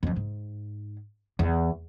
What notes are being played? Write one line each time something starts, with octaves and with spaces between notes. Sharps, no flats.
F2 F3
G#2
E2